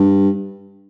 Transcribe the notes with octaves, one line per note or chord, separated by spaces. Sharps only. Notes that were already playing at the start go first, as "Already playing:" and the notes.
Already playing: G2